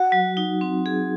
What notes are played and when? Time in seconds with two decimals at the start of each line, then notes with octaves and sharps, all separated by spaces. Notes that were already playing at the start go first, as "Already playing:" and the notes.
Already playing: F#4 F#5
0.12 F#3
0.37 D#4
0.61 C4
0.86 G#4